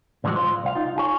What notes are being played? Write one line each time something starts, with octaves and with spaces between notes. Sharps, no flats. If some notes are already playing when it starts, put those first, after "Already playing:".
A2 D3 E3 F3 G#3 F#4
F4 C5
C2 F5
D#4 F4
F4 G#4 C#5